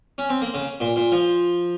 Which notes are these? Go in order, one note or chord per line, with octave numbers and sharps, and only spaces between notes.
C#4
C4
A#3
C#3
A#2
A#2
F3